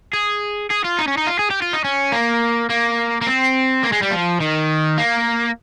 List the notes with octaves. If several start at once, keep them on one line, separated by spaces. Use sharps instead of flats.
G#4
G#4
F4
D#4
C#4
D#4
F4
G#4
G4
F4
D#4
C#4
A#3
A#3
A#3
C4
A#3
G#3
G3
F3
D#3
A#3